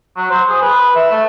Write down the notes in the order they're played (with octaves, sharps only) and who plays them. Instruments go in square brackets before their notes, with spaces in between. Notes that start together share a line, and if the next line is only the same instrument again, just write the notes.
[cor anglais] F#3
C5
G#4
B4
E5
A3